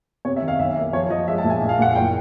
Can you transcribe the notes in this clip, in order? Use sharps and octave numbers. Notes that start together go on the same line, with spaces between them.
C3 C#5
E5
D#3
F5
B1 E5
A#3
F3 C#5
F3 D#5
G#3 E5
A5
A#2
G#5
A#1
F5
A#2 F#5
F#1 G5